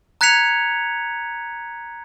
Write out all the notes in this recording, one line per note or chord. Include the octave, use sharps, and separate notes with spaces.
A#5 F#6 G#6 B6 C#7 F7